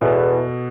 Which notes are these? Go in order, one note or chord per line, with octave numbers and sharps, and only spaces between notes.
E2 B2 B3 A4